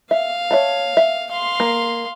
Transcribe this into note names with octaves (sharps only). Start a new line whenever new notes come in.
E5 F5
C#5 E5 A5
E5
F5 C6
A#3